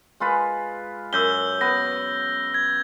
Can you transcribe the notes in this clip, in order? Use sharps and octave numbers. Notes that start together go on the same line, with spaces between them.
G#3 F4 B4
F#2 E6 G6 G7
B3 A#6
G#6